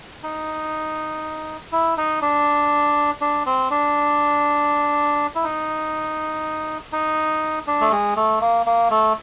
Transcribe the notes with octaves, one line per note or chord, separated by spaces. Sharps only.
D#4
E4
D#4
D4
D4
C4
D4
E4
D#4
D#4
D4
A3
G#3
A3
A#3
A#3
A3